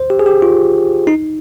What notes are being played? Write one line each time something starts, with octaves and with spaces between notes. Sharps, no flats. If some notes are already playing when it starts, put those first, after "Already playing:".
Already playing: C5
G4
G#4
G4
F4
D#4